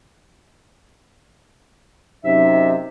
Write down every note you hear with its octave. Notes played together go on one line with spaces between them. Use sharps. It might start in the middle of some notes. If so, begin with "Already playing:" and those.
F#2 C3 D#4 E5